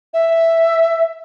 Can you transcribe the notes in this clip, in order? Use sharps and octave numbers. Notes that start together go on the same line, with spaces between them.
E5